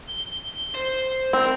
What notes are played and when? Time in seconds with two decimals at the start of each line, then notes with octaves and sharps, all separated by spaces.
0.08 G7
0.75 C5
1.33 C4 A#4 E6